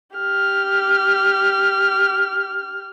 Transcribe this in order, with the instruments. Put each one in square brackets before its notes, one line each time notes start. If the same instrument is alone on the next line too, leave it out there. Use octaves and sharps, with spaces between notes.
[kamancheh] G4 F6